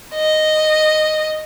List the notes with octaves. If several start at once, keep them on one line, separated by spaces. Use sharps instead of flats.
D#5